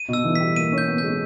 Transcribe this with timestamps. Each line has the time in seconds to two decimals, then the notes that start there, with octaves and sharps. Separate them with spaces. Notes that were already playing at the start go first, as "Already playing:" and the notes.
Already playing: D#7
0.09 B2
0.13 E6
0.24 E3
0.35 B6
0.41 G3
0.56 A#3 D#7
0.72 C#4
0.78 G6
0.88 B3
0.98 G6
1.04 G#3